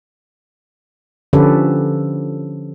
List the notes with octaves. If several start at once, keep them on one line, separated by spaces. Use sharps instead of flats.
D3 F3 C#4 G4 A4 B4